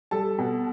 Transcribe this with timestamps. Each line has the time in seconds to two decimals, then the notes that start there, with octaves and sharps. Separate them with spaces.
0.11 G3 A4 A5
0.39 B2